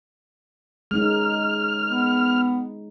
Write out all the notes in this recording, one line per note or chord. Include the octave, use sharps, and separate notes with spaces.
G#3 C#4 D#4 F6
B3